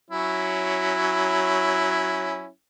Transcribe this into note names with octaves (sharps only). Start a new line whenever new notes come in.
F#3 C#4 E4